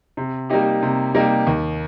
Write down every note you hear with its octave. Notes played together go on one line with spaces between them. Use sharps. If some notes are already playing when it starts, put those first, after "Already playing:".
C3
G3 A#3 D#4 G4
C3
G3 A#3 D#4 G4
D#2